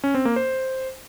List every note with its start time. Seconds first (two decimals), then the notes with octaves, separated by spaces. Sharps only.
0.04 C#4
0.14 C4
0.25 A#3
0.36 C5